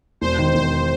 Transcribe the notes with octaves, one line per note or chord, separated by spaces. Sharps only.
E1 C5
D#3
E1 C5